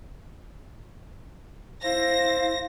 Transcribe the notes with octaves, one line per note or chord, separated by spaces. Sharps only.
E4 C5 F5 A#6